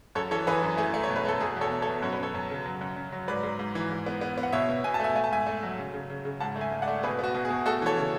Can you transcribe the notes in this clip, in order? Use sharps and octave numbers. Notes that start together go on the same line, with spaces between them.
F#2 A4 C#5
E3 A4 C#5
E3 G#4 B4
F#2
A3 G#4
A3
C#5
B2
B4
A3 A4
B2 G#4
E2 A4 C#5
E2
A4 C#5
B2
F#2 C#5
B4
F#2 A4 C#5
F#2
C#3
F#3
F#2
F#2
F#3
G#2 B4 D5
G#2
G#2
E3
G#2
B3
B3
B3
F#5
B2 C#5 E5
B2
B2 G#5
A5
A3 E5 G#5
A3 G#5
A5
G#2 E5 G#5
A3
F#3
C#3
C#3
C#3
C#3
G#2 F#5 A5
A3
E5 G#5
G#2
D5 F#5
A3
B2 G#4 B4
B3 F#4
B2
G#4
B2
A3 F#4 A4
E3 A4 C#5
C#3